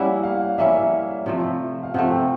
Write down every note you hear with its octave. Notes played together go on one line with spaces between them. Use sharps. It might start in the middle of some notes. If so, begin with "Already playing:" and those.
Already playing: G3 A#3 C#4 E4 F#5
F5
G3 A#3 C#4 E4 E5
E5
C3 F3 A3
F5
C3 F3 A3 F#5
G5